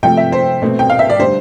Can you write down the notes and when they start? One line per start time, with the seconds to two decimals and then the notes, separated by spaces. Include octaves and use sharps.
0.03 C3 F3 A3 G5
0.17 E5
0.32 C5
0.62 B2 A3 C4
0.79 G5
0.90 F5
0.99 E5
1.10 D5
1.19 D3 G3 D4 C5